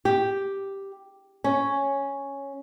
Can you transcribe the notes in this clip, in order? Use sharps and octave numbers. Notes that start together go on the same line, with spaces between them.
G4
C#4